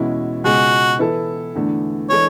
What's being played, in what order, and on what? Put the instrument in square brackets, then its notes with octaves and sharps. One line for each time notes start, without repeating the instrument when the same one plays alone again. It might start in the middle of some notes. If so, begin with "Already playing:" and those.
Already playing: [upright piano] E2 B2 G#3 C#4 E4
[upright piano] C#2 B2 G#3 C#4 G#4 [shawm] F#4
[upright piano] E3 B3 E4 A4
E2 D3 A3 D4
[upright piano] E3 G#3 D4 A4 [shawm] C#5